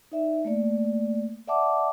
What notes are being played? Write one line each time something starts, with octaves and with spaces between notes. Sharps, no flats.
D#4 D5 E5
A3 A#3 D5
D5 E5 F#5 A5 D6